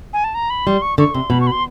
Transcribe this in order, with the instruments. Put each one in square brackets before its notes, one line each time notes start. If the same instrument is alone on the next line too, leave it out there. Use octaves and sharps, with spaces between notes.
[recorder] G#5
A5
A#5
B5
[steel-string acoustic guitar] G3 [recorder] C6
[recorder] C#6
[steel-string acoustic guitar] D3 [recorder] C#6
[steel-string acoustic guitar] C3 [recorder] C6
[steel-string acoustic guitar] B2 [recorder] B5
[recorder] C#6
B5
C6